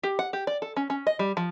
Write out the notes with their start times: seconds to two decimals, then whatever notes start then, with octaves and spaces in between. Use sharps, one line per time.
0.03 G4
0.19 F#5
0.33 G4
0.47 D5
0.62 A4
0.77 C#4
0.90 C#4
1.07 D#5
1.19 G3
1.37 F3